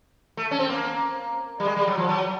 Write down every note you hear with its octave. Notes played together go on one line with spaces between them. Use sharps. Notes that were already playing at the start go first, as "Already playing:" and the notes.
A3
C#4
C4
A#3
G3
G#3
G3
F#3
F3
F#3